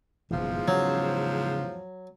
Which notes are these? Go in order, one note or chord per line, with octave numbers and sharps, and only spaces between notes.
F#1 E2 G#2 B2 E3 F3
C#3 F#3 C#4